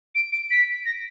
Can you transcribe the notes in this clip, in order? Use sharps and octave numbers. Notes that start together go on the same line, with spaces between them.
D7
D7
B6
A#6